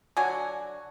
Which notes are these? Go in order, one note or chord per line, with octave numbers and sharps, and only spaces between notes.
D3 F#3 F#4 G#5